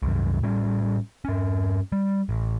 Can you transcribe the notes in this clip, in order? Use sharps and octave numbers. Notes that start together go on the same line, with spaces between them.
C2 F#2
A2 G3 C#4
G2 C#4
G3
A1